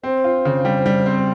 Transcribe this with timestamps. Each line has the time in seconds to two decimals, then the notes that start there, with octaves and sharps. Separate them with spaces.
0.03 C4 C5
0.24 F4
0.45 C#3
0.65 G3
0.86 G3
1.06 C4